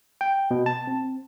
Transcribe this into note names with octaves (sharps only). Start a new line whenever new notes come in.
G5
B2
A5
C4